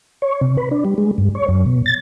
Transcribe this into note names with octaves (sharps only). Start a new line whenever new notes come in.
C#5
C3
B4
D4
G3
G#3
G2
C#5
F#2
B2
A6